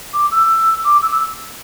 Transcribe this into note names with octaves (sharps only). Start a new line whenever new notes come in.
D6
E6
D6
E6